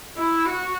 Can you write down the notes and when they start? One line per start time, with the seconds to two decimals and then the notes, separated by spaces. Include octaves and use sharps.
0.17 E4
0.46 F#4